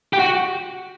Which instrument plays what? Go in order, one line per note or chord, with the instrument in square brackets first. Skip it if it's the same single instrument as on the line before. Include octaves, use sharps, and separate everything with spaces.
[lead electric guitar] G4
F#4